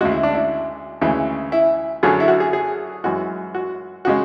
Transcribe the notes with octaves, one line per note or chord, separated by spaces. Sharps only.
D2 C#3 G#3 F#4
E4
D4
E4
D2 C#3 E3 G#3
E4
F#2 D3 F#3 G#4
E4
F#4
G#4
G#4
F#2 E3 G#3 F#4
F#4
C#3 G#3 F#4